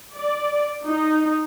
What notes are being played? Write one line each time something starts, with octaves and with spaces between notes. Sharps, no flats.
D5
D#4